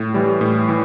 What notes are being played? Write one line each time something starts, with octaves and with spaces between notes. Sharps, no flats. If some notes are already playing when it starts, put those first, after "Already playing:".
Already playing: A2
E3 G3
A2
E3